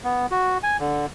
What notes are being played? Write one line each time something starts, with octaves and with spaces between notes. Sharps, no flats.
B3
F#4
G#5
D3